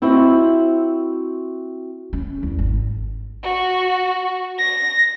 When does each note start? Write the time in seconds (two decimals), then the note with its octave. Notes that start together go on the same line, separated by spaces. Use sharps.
0.02 C4 E4 F#4 C5 D#5
2.13 C#4
2.43 E2
2.59 G#1
3.43 F#4
4.58 A#6